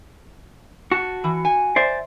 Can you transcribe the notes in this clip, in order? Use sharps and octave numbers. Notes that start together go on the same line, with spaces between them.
F#4 A5
E3
G#5
C5 D5 E5